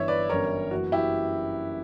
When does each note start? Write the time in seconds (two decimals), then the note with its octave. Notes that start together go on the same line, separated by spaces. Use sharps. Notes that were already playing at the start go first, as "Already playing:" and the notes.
Already playing: G1 G2 E3 C#5 E5
0.08 B4 D5
0.29 G1 F#2 E3 G3 A#4 C#5
0.71 F#1 F#2 E3 F#4
0.92 E4 G4